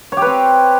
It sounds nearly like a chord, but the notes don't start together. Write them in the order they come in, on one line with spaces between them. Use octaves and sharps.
C#5 G4 B4 C4